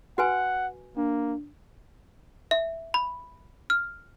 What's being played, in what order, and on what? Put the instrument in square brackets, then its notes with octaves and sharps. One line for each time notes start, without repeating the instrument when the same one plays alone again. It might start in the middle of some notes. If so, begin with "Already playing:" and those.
[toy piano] F#4 B4 G#5 [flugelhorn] F#5
[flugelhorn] A#3 [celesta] D4
[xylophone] E5
B5
F6